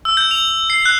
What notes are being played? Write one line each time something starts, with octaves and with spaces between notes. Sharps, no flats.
E6
G6
F7
C7
F#6